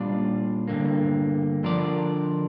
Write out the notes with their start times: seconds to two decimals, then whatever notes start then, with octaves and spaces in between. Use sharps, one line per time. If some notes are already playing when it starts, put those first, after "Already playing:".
Already playing: A#2 G3 D4 F4 D5
0.68 G2 D3 A#3
1.63 D3 F3 D4 A#4 D5